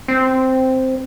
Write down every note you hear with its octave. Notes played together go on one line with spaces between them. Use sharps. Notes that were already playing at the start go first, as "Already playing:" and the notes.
C4